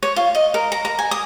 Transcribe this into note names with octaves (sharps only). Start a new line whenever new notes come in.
C#5
F4
D#5
A#4
A#5
A#5
G#5
D#6